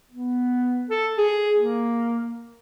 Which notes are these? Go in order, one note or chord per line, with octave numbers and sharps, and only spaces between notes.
B3
A4
G#4
A#3